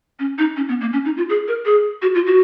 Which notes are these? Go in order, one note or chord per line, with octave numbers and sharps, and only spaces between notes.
C#4
D#4
C#4
B3
A#3
C#4
D#4
F4
G#4
A#4
G#4
F#4
F4
F#4